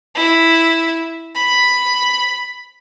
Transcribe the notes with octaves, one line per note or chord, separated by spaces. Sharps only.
E4
B5